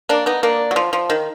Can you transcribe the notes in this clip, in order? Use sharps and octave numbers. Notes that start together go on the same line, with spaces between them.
A#3 D4
B3 D#4
A#3 D4
F#3
F3
F3
D#3